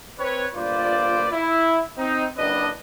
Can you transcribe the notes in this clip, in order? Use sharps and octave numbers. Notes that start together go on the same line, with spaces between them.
C4 B4 C#5
G1 A#2 F4 B4 C5 D5
E4
C4 D#4
F#1 D4 B4 D#5